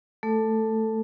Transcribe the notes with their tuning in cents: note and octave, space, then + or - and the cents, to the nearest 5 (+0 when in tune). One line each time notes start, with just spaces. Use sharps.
A3 +0 A4 +10